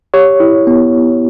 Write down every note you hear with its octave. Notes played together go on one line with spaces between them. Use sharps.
G4 C#5
E4
B3